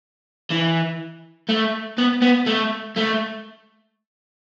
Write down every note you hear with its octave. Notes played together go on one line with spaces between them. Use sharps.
E3
A3
B3
B3
A3
A3